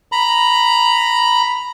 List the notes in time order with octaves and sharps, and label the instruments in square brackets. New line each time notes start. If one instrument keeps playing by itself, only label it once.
[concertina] A#5 B5